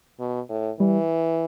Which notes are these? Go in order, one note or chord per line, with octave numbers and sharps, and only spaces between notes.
B2
A2
E3 G3